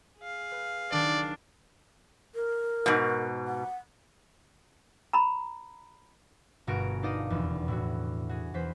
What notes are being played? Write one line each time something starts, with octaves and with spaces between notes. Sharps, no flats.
G#4 F5
B4
B1 D#3 D4 D5
A#4
G#2 B2
F#5
A#5 B5
G1 B2 F#4 G#4 A#4 D7
D4 D#4 F4 D5 D#5
F1 E2
A2 E4 F#4
F#4 G#4
E2 B4 C5 B6